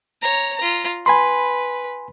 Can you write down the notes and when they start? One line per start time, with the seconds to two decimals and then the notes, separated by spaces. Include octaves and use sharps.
0.22 C#5 A#5
0.56 F4 A#5
1.06 B4 G#5 B5 C6